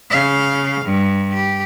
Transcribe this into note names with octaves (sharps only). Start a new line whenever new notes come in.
C#3 F5
G2
G4